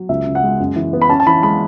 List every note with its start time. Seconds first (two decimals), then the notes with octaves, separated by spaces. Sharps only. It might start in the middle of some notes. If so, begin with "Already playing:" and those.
Already playing: F#3
0.09 C#2 E5
0.26 C#3
0.35 F#5
0.43 G#3
0.60 F#2
0.76 E3
0.93 B3
1.02 B5
1.09 C#4 A5
1.20 A5
1.27 E3 B5
1.43 G#3 B5